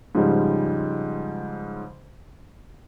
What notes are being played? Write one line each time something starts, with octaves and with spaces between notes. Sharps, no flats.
G#2 C#3 F3 G3 G#3